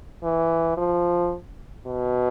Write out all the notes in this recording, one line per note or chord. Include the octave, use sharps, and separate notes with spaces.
E3
F3
B2